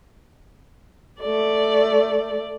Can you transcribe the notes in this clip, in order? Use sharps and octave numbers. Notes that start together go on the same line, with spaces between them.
A3 D5